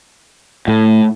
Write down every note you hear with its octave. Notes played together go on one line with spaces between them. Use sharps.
A2